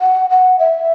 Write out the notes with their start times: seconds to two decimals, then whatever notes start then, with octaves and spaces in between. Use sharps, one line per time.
0.01 F#5
0.30 F#5
0.59 E5